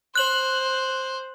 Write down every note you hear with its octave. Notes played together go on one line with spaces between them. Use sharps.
C5 F#6 F#7